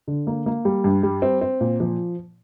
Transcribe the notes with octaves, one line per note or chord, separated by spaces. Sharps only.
D3
A#3
A#3
G3
G2
G3
C4
C4
A#2
F3